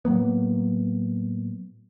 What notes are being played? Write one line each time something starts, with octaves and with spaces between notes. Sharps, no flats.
A2 F#3 A#3 B3